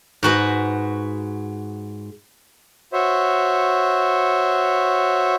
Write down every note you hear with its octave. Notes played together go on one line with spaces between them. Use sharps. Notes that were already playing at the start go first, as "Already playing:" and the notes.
G#2 F#4 B4 D#5
F#4 C5 C#5 E5